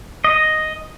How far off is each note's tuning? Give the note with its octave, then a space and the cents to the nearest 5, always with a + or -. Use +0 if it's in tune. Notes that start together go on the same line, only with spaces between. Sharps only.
D#5 +0